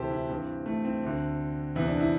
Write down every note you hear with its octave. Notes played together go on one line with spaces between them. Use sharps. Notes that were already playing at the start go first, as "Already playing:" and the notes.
Already playing: D2 C3 E3 G4 A4 C5
E4
G2 E3 C4
A3
C4
D2 D3
E2 C3 E3 E4
D4
E4